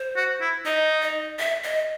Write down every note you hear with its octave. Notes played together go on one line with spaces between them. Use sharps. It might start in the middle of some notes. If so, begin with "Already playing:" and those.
Already playing: C5
F#4
E4
D#4 D#5
D#5
E5
D#5